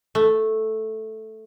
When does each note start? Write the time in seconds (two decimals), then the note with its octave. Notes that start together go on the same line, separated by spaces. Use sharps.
0.15 A3